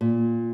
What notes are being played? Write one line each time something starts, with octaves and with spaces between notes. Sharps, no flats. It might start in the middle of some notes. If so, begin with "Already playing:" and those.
A#2